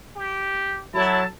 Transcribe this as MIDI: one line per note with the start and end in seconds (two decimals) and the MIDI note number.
0.16 0.83 67
0.94 1.24 54
0.94 1.21 64
0.94 1.24 69
0.94 1.24 81